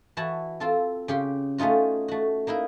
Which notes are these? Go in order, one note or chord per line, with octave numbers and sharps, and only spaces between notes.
E3 E4 F#4 A5
C4 F4 A4
C#3 G4 C6
A3 C#4 D#4 F4 F#4
A3 F#4
A#3 D#4 E4 A#4